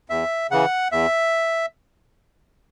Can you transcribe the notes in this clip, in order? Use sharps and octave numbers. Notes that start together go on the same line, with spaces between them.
E2 E5
C#3 E3 F#5
E2 E5